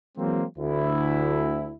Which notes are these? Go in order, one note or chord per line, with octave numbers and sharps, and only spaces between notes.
E3 F#3 G#3 A#3 C4
D2 E4